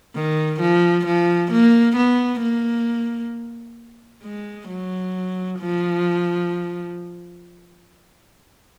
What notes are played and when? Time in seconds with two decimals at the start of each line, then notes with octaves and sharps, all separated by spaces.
0.15 D#3
0.61 F3
1.06 F3
1.52 A#3
1.96 B3
2.42 A#3
4.23 G#3
4.69 F#3
5.59 F3